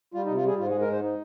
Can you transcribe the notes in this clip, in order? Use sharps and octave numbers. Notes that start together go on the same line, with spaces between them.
G3 F4
D#4
C3
F4
G3 G#4
G#2 F4
G#4
G#3
A#4
G#2 C5
D#4